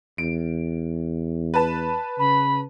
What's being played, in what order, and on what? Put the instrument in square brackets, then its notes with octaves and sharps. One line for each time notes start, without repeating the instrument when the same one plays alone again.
[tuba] E2 [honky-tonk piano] D7
[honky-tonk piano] B4 A5
[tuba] C#3 [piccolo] B5